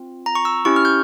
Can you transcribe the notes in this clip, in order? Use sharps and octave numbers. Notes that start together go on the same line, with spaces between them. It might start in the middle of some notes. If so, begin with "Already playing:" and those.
Already playing: C4 F4
A#5
C#6
E6
C#4 E4 G4 C#6
F6
G6